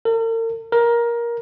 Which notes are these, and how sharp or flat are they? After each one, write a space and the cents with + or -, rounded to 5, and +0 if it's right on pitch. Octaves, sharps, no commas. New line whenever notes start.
A#4 -45
A#4 +15